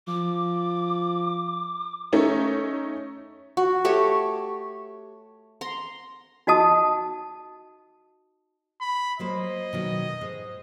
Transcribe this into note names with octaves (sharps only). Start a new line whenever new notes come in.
F3 D6
A3 C#4 D#4
F#4
A3 G4 C#5
A#5 C6
D#4 F#4 D#5 A5 D#6
B5
F#3 A#3 C5 D#5
B2 D#3 F#3
G#2 G#3